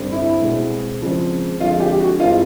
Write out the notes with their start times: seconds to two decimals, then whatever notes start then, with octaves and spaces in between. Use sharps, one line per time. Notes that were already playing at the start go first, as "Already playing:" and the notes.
Already playing: G2 D3 G3 C4
0.12 E4
0.41 B2 G#3 C4
1.01 C#3 F3 G#3 C4
1.60 F2 D3 F3 G#3 F4
1.80 G4
2.01 F#4
2.20 G2 E3 G#3 C4 F4